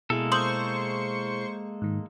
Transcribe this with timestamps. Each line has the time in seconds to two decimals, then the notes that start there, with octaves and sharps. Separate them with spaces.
0.10 B2 G#3 A#3 E4 G#4 A4
0.32 C5 C6 C#6 D#6 F#7
1.82 G#2 D#3